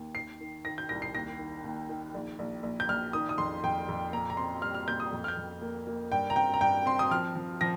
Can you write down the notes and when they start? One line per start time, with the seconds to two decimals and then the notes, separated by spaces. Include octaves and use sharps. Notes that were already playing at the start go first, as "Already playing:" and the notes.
Already playing: D#2
0.15 D#3 C7
0.41 D#3
0.65 D#3 A#6
0.78 G6
0.89 C2 A#6
1.02 C7
1.14 D#2 A#6
1.39 D#3
1.64 D#2
1.89 D#3
2.14 A#1
2.39 A#1
2.63 A#1
2.80 G6
2.89 A#1 F6
3.13 D#3 D#6
3.29 D#6
3.38 F2 C6
3.63 F2 G5
3.88 F2
4.13 A#2 A#5
4.30 A#5
4.37 C4 C6
4.62 G3 F6
4.74 F6
4.88 A#2 G6
5.00 D#6
5.13 F2
5.24 F6
5.28 G6
5.37 F2
5.62 A#3
5.87 A#3
6.12 G2 G5
6.30 A#5
6.36 C4 G5
6.54 A#5
6.61 G2 G5
6.86 C4 C6
6.99 D#6
7.11 F3 F6
7.35 F3
7.61 F3 A#6